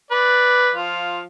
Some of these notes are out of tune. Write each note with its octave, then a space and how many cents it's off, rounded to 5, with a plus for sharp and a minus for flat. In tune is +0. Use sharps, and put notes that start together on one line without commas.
B4 +0 D5 +0
F3 +10 F4 +0